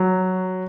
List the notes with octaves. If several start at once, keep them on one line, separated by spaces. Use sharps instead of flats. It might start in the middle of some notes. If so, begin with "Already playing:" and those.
Already playing: F#3